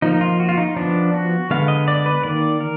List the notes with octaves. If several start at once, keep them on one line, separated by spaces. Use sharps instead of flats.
F3 A#3 D#4
F4
F#4
F4
D#4
F3 B3 D4
F#4
D3 G#3 B3 F5
D#5
D5
B4
D#3 A#3 D5
A#4